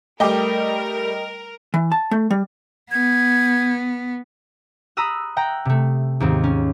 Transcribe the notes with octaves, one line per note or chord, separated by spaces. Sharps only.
G3 A3 A#4 D#5 G5 D6
E3
A5
A3
G3
B3 G#6
A#5 B5 D#6 E6 F#6
F#5 G5 A#5
C3 A3
D#2 G#2 C4
C#4